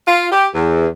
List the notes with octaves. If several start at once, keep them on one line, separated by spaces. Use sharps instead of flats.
F4
G4
E2